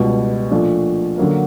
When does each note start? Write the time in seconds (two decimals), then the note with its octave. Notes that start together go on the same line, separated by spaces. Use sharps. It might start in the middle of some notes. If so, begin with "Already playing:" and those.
Already playing: C#2 B2 G3
0.51 A#2 F3 A3 D4
1.18 D3 F#3 A#3